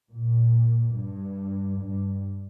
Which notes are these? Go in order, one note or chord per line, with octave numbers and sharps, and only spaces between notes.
A#2
G2
G2